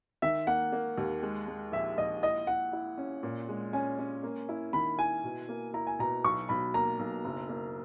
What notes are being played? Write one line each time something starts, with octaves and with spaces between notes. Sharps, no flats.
D#3 E5
A#3 F#5
A#3
D#2
G#3
G#3
A#1 E5
A#1 D#5
E4 D#5
E4 F#5
E4
C#4
A#2
G#3
C#4 G#5
C#4
A#3
E4
D#3 B5
E4 G#5
B2
A#3
E4 A#5
G#5
B2 A#5
B1 C#6
B1 B5
A#3 A#5
B1
F#1
A#3